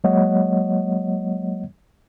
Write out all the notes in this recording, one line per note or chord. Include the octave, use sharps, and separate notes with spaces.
F#3 G#3 A#3 C#5 D#5 F#5